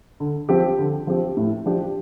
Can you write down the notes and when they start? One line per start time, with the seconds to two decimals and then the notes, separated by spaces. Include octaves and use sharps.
0.20 D3
0.49 F3 C4 G4
0.79 D3
1.07 F3 C4 G4
1.37 A2
1.66 F3 D4 G4